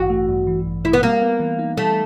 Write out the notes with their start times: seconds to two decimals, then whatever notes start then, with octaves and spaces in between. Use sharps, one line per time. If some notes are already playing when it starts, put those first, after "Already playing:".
Already playing: A1 G2 E3 F#4
0.10 A3
0.29 G2
0.47 E3
0.65 A1
0.84 A3 E4
0.93 B3
1.03 G3 A#3
1.22 B3
1.40 E3
1.59 D#4
1.77 G3 A3